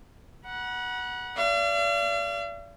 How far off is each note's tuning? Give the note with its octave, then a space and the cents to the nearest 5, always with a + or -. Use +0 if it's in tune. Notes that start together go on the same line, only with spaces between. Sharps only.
F#5 +0 B5 -40
D5 -30 F5 -45